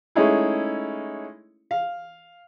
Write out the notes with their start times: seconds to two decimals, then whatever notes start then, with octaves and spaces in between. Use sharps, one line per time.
0.15 G#3 A3 C#4 D#4 E4 G#4
1.71 F5